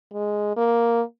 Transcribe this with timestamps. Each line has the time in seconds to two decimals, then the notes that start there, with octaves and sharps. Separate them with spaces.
0.14 G#3
0.57 A#3